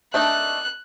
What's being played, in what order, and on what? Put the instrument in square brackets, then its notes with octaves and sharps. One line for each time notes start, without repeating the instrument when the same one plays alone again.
[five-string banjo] A3 D4 D#4 [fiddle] F#6